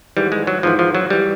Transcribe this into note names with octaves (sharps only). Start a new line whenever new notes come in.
G#1 G#2 E3 G3
G#3
F#3
G#1 G#2 E3 F3
F3
F#3
E3 G3